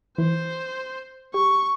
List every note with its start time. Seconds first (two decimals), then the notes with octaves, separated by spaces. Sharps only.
0.18 E3 C5
1.34 G4 C#6